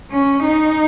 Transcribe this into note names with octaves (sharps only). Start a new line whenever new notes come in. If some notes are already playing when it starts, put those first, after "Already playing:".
C#4
D#4